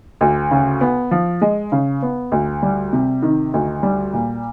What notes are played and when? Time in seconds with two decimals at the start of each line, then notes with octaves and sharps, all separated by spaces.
0.21 D2
0.51 C#3
0.81 B3
1.11 F3
1.42 G#3
1.72 C#3
2.02 B3
2.32 D2
2.63 G3
2.93 C3
3.23 D#3
3.54 D2
3.83 G3
4.13 A#2